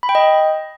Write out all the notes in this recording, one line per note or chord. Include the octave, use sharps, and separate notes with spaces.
B5
G5
D#5